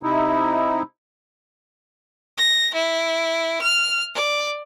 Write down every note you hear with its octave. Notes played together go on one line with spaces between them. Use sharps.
C3 D#4 E4
A#6
E4
F6
D5